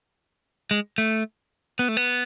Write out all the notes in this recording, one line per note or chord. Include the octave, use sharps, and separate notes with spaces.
G#3
A3
B3
A3
B3